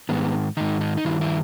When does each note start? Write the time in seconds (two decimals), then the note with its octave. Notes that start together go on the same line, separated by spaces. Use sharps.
0.09 G#2 D#3 B3
0.57 G#2 D#3 D#4
0.81 D#4
0.97 D#4
1.05 G2 D#3 E4
1.21 E4